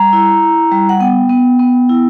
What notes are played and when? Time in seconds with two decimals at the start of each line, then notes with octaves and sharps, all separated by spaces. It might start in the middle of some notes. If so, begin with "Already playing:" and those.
Already playing: G3 A#5
0.13 E4
0.42 E4
0.72 G3
0.89 F#5
1.00 B3 G5
1.29 B3
1.59 B3
1.89 E4